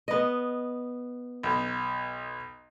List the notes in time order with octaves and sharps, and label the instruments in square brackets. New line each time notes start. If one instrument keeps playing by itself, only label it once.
[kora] B3 D#5
[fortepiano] B1